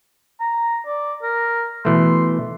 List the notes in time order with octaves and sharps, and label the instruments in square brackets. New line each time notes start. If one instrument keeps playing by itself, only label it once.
[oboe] A#5
D5
A#4
[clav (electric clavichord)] B2 E3 A3 [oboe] C6